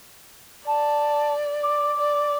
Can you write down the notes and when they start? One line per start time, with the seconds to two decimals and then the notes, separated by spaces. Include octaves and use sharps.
0.66 D5 A5
1.62 D6
1.97 D5